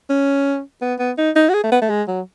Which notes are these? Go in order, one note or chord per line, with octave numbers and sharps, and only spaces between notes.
C#4
B3
B3
D#4
D#4
F#4
G#4
A3
B3
A3
G#3
F#3